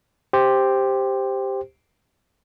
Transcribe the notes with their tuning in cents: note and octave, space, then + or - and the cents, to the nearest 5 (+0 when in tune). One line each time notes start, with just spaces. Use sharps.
G4 +5 C5 +0